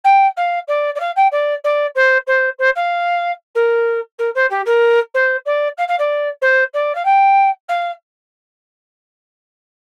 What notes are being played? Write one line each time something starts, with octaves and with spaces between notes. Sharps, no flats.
G5
F5
D5
D5
F5
G5
D5
D5
C5
C5
C5
F5
A#4
A#4
C5
G4
A#4
C5
D5
F5
F5
D5
C5
D5
F5
G5
F5